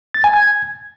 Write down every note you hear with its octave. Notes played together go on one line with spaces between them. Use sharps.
A6
G#5
G#6